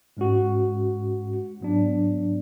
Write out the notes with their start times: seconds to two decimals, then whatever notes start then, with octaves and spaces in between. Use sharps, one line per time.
0.17 G#2 G#3 C#4 F#4
1.61 G#2 F#3 B3 D4